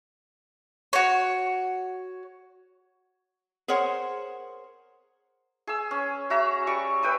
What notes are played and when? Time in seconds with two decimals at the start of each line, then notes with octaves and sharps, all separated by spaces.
0.93 F#4 C#5
3.68 G#4 A#4 C5 C#5 F#5
5.67 G#4 E6
5.91 C#4
6.30 F#4 E5 A#5
6.67 G3 C#6
7.02 B4 G5 D#6 E6